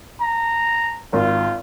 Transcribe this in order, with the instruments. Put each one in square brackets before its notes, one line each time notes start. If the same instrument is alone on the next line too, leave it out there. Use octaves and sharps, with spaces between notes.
[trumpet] A#5
[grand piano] G#1 [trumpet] F4